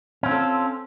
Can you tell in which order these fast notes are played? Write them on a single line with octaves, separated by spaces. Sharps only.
C#4 C4 F4 A4